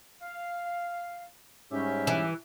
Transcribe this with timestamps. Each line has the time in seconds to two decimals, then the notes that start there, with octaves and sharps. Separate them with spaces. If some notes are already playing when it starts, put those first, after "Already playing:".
0.22 F5
1.72 G#2 G3 C#4 G4 E5
2.07 E3